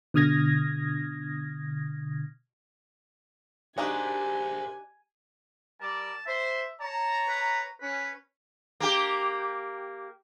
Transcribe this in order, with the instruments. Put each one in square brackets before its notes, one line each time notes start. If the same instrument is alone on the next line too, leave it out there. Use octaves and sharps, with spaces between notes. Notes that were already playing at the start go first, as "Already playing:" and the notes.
[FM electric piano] B2 D3 D#6 F6 G#6 A#6
[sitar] C3 G4 [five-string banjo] D4 D#4 F#4 [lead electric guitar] A#4 C5 [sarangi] G#5
[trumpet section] G3 A#4 D5 [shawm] A5
[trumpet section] C5 [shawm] E5
[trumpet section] C#5 A#5 [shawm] A5
[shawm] B4
[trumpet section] C#4 [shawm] B4
[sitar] A#3 G4